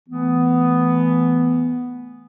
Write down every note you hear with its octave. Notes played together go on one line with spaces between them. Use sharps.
E3 A3 B3